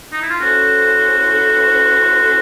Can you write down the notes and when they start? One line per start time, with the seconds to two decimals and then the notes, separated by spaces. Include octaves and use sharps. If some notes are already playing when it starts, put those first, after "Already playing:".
0.12 D#4
0.22 E4
0.30 F4
0.40 C#4 E4 F#4 A4 C5